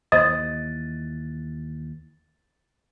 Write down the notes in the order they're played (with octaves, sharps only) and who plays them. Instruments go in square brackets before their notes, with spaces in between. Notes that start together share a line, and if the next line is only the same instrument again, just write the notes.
[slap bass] D#2 E3 [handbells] C5 D#6 [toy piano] D#5 [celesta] A6